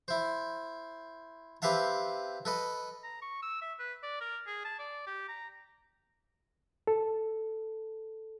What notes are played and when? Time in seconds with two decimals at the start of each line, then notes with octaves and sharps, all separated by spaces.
0.08 E4 C5
1.62 C4 G4 B4 E5 F5 A5
2.45 A4 B4 D#5
3.03 A#5
3.22 C#6
3.42 E6
3.61 E5
3.79 B4
4.03 D5
4.20 A#4
4.47 G#4
4.65 A5
4.79 D5
5.06 G4
5.28 A#5
6.87 A4